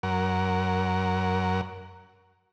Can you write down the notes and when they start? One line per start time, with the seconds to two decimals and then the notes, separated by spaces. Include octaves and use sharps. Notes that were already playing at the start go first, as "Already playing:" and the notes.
0.03 F#2 A#4 F#5